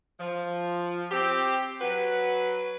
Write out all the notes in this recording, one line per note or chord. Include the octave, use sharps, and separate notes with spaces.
F3
C4 G4
F#3 F#4 B4